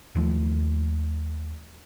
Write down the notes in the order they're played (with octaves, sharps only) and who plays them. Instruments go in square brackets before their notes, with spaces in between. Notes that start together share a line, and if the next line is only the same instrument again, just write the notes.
[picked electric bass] D#2 F3 A3